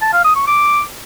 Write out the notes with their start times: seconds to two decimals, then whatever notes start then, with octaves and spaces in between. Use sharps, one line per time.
0.01 A5
0.13 F5
0.24 D#6
0.36 C#6
0.47 D6